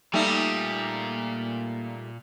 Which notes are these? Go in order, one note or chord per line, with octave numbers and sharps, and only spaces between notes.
A#2 G3 A3 D#4